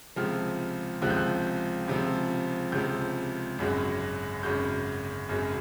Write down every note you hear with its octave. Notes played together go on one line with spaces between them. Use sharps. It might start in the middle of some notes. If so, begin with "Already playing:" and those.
C#2 C3 F3 F6
C#2 C3 F3 F#6
G6
F#6
C#2 C3 F3
C#2 C3 F3 G6
G#1 F#2 C#3 F#3
G#1 F#2 C#3 F#3 G6
G#1 F#2 C#3 F#3